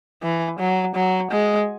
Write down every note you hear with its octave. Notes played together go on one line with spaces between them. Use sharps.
E3
F#3
F#3
G#3